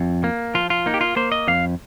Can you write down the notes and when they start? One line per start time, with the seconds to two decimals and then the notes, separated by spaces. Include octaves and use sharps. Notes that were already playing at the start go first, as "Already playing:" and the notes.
Already playing: F2
0.24 A#3
0.54 F3 F4
0.70 F4
0.86 A#3 D#4
0.94 G4
1.01 F4
1.16 A#3 C5
1.32 D#5
1.48 F2 F5